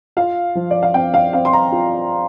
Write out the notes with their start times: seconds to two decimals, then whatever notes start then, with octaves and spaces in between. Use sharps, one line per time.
0.17 F4 F5
0.55 F3
0.71 D5
0.83 F5
0.94 C4 G5
1.14 F5
1.33 C4 F5
1.45 C6
1.53 A#5
1.72 F4